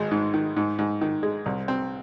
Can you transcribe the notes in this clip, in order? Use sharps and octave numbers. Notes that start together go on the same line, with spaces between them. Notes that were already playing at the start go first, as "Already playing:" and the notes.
Already playing: G#1 G#3
G#2
D#3
G#2
G#2
D#3
G#3
C2
C4